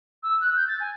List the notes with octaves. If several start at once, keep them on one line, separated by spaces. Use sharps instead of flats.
E6
F#6
G6
A6
G#5